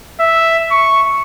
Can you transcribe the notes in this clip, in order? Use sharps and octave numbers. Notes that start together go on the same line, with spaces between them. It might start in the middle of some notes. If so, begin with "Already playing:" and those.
E5
C#6